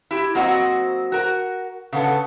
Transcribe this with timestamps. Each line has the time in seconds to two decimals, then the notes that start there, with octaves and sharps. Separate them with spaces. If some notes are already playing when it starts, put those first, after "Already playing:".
0.11 E4 G4
0.35 F#3 A#3 C4 F#4 C5 D#5
1.12 F#4 A#4
1.92 C#3 B3 A4